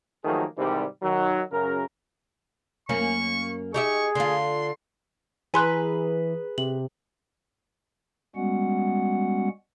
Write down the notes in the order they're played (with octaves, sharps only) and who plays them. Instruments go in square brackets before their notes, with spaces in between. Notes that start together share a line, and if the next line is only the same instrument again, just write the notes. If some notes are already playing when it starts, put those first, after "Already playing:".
[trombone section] D#3 F3 F#3 A3 A#3 G#4
G#2 C3 D#3 E3 G3
D#3 F#3
F#2 C#3 A#4
[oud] F#2 A#3 C#4 [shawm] C#6
[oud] D#4 G4 E5 [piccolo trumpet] G#4 [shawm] C#6
[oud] D3 F4 [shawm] C6
[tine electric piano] E3 [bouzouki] G#4 B4 A#5 [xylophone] G#5 C6 F#6
[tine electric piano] C3 [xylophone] F#7
[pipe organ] G3 G#3 B3 C#4 F#4 F#5